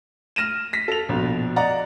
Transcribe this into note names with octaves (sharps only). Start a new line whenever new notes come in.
F6 A#6 D#7 E7
A#6 B6
A4 F7
A#1 B2
D5 D#5 F#5 A#5